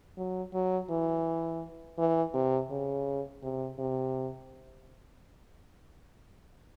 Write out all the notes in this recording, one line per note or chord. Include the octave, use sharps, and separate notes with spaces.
F#3
F#3
E3
E3
C3
C#3
C3
C3